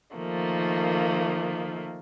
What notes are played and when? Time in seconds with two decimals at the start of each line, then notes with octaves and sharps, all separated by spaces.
0.16 D#3 F3 A3 A#3